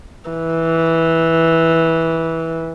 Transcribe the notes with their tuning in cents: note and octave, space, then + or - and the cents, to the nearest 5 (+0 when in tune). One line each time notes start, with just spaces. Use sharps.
E3 -10